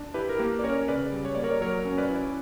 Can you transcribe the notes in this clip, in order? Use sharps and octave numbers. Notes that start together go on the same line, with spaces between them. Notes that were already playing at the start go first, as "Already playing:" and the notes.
Already playing: D4
E4 G4 B4
A#4
A#3 G4
D5
C#4 A#4 C#5
C#3 B4 D5
G3
C#5
A#3 D5
A#4 C#5
F#3 A#4 C#5
C#4
B4 D5
E4